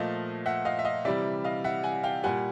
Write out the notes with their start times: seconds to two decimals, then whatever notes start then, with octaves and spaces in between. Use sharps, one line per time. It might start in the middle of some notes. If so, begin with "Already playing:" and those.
Already playing: A#2 F3 A3 D#5 F5
0.46 E5 F#5
0.65 D#5 F5
0.79 E5
0.85 D#5 F5
1.05 C3 E3 G3 D5 E5
1.44 D#5 F5
1.64 E5 F#5
1.83 F#5 G#5
2.03 F5 G5
2.24 A#2 G3 F#5 G#5